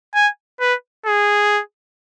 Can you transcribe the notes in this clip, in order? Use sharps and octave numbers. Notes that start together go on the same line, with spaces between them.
G#5
B4
G#4